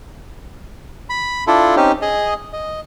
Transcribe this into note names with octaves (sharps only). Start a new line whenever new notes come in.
B5
D4 E4 F4 A4
C4 C#4 D#4 G4
G#4 D#5
D#5